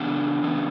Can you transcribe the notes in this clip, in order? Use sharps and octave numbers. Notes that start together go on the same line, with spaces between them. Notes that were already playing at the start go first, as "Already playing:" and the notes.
Already playing: C#3 E3 B3 D4
C#3 E3 B3